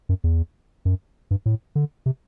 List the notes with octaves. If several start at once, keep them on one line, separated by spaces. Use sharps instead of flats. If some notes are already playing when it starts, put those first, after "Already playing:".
F#2
E2
F#2
G2
A2
D3
C3